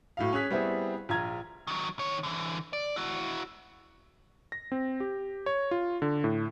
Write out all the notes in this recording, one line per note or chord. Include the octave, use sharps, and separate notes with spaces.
A2 F#3 F5
C#4 G#4 F#6 B6
G3 B3 C4 E4 G#4
A#1 F4 A#5 G#6
D#3 F#3
D#3 C#5
D3 E3
D5
E4 F#4
A#6
C4
G4
C#5
F4
D3
A2